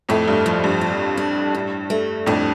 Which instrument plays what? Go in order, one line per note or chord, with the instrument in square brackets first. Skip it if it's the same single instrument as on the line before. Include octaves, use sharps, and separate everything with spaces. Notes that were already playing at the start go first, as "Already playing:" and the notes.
[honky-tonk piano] F2 A2 [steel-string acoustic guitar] A3
[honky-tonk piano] G2
[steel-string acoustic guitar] F3
[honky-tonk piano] G2
[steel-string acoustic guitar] F4
D4
A2
A3
[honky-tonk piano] F2 A2 [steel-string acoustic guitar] D4